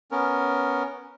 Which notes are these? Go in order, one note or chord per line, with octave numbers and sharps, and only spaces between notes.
B3 C#4 A#4